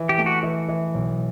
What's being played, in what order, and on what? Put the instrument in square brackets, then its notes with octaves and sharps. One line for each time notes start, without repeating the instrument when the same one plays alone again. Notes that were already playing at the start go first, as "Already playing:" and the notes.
Already playing: [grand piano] E3
[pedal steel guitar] G4
[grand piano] A3
[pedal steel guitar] F#4
[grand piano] E3
E3
B1